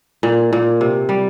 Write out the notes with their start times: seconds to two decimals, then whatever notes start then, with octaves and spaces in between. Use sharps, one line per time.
0.23 A#2
0.53 A#2
0.81 C3
1.09 G3